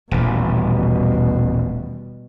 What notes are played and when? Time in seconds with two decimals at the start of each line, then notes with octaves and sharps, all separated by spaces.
0.11 D#1 A1 B2 G3